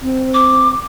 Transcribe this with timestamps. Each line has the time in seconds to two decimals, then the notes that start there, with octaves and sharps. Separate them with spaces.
0.02 C4
0.34 D6